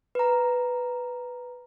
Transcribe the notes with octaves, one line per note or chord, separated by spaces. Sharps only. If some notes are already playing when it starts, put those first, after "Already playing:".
B4 A#5